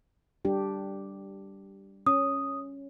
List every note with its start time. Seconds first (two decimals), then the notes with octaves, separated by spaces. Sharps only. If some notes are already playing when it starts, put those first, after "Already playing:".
0.45 G3 D4 G4
2.07 C#4 D#6